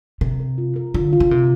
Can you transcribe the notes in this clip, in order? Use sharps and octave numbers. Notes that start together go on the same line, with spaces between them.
C3 A#4
A#4
F4
A#4
D3 F4
F4
D3
C3 A#4